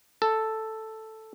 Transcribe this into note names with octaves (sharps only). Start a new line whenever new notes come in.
A4